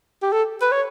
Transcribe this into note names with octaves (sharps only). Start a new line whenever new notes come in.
G4
A4
B4
C#5